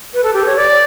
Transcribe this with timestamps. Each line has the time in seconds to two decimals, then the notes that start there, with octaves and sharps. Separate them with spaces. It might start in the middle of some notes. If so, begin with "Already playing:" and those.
0.14 B4
0.23 A4
0.33 G4
0.46 C#5
0.56 D5